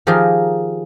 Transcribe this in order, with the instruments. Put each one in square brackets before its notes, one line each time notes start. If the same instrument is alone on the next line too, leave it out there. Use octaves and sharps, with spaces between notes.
[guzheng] D#3 F3 D#4 G4 G#4 A#4